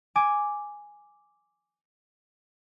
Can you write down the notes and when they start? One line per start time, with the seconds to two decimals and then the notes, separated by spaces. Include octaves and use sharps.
0.16 G#5 D6